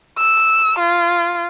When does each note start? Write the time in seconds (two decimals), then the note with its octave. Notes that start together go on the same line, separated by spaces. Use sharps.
0.19 E6
0.79 F4